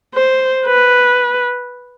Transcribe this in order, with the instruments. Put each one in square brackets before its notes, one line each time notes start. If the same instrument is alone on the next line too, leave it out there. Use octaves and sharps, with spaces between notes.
[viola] C5
B4